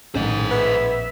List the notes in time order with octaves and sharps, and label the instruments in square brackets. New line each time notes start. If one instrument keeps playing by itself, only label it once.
[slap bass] A#1 C#4 [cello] A2 D#3 [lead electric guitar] C5 D#5
[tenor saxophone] B3 [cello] E5